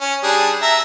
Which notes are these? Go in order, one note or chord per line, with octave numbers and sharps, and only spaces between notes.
C#4
G3 D4 G#4
E5 A#5